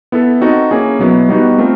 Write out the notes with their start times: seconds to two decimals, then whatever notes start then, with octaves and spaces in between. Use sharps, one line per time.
0.12 B3 E4 A4
0.41 C4 D#4 F#4 A4
0.71 A#3 C#4 E4 G#4
0.99 B2 F#3 B3 E4
1.29 G3 B3 D#4 F#4
1.58 A3 C4 F4 A#4